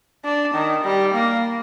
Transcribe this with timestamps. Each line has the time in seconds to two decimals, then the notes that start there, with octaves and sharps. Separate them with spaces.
0.25 D4
0.54 D#3
0.84 G3
1.14 A#3